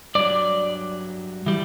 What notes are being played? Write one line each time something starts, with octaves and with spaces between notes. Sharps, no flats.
G2 F#3 D5
E3 G3